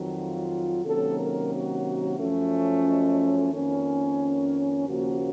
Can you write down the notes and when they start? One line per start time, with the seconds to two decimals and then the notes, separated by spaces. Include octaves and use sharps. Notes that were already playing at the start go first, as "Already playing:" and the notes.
Already playing: F2 D#3 F#3
0.17 F4
0.85 C3 D#3 F#3 A#3 C#4 A4
1.18 A#4
1.52 F#4
2.18 F#2 F3 A3 C#4
2.86 D#5
3.19 C#5
3.53 F2 D#3 A#3 C#4
4.87 D#2 C#3 F3 A#3 C#4 F#4